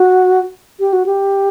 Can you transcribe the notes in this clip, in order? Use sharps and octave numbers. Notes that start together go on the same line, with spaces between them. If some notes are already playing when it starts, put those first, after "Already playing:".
Already playing: F#4
G4
F#4
G4